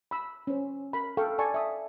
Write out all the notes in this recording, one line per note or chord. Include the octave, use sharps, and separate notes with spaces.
B5 E6
C#4 C5
A#4 B5
A4 F5 G5 C#6
D5 G#5 A5 C#6
E5 D#6